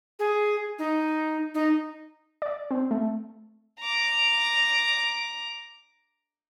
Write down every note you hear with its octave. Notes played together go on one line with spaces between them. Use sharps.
G#4
D#4
D#4
D5
C4
A3
A#5 D6